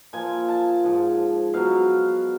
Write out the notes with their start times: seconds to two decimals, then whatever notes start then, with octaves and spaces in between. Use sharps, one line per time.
0.13 A#2 F3 G#5
0.48 A5
0.84 G#2 F3
1.54 B2 F#3 F5